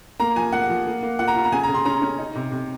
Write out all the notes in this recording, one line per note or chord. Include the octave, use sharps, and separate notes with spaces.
A#3 A#5
F3 G#5
A#3 F#5
F3
A#3
A#3
F4 F#5
A#5
F4
A#5
C#3 G#5
A#5
C#3
C6
C#4 A#5
C#4
D#4
C3
C3